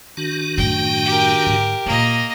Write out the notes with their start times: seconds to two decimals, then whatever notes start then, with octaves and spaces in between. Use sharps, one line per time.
0.17 D#3 D4 F#4
0.57 F#2 A2 G5
1.06 G4 A#4
1.47 G#2 D3
1.86 A#2 A#3 E4 D#5